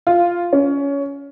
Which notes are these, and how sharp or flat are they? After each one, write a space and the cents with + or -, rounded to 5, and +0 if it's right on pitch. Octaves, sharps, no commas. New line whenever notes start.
F4 -5
C#4 +20